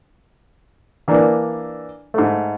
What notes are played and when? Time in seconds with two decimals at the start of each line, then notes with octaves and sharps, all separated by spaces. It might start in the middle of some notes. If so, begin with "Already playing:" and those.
1.08 E3 A#3 D4
2.14 G#2 A3